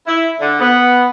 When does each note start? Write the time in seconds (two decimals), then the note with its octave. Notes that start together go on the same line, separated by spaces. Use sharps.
0.06 E4
0.40 D3
0.60 B3